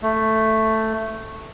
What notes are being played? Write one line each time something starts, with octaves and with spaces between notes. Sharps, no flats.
A3